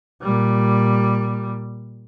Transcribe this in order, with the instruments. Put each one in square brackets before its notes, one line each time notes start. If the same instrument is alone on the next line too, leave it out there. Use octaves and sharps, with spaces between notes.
[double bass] A#2 G3